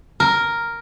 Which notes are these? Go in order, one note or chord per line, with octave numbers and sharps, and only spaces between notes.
A#4